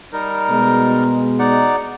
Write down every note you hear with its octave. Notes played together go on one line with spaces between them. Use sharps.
G3 D#4 A#4
B2 G#3
D#4 D5 F#5